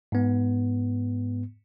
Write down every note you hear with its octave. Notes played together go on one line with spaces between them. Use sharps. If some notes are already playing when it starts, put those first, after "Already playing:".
G#2 B3